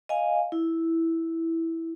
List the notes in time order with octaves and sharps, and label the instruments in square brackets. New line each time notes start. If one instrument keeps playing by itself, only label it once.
[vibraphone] D#5 F5 G#5
E4